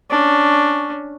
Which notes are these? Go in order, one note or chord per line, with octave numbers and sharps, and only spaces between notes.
C#4 D4